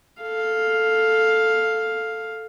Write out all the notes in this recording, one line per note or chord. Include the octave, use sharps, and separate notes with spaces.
A4 F5